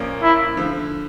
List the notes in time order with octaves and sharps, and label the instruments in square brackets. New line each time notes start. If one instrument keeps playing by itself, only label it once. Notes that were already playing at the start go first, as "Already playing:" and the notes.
Already playing: [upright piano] A#1 A#2 F3 A#3 C#4
[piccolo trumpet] E4
[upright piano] D3 F3